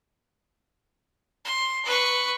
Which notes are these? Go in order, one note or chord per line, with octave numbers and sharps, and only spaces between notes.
C6
B4 C#6